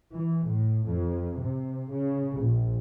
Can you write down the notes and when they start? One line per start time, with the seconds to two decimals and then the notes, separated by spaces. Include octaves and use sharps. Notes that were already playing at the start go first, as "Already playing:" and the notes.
0.13 E3
0.46 A2
0.86 F2
1.41 C3
1.90 C#3
2.40 A#1